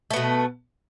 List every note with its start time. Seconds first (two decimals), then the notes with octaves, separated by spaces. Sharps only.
0.11 A3
0.13 B3
0.16 B2